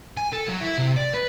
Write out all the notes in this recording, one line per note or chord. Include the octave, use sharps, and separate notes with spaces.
G#5
A4
F#3
E4
C3
D5
B4